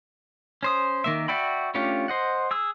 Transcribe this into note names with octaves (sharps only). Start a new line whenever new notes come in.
C#4 C5 D#6
D#3 A#3 E5
F#4 D5 E5 G5 B5
A3 C#4 D4 F4 G4
C5 D#5 F#5
G#4 E6